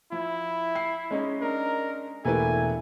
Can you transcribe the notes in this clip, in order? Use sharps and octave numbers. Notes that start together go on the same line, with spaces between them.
F3 E4
C7
G#3 C#4 D#4
D4 A#4
E1 A3 A#3 E4 B4 G#5